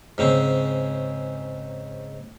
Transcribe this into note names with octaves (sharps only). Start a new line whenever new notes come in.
G#2 C#3 C4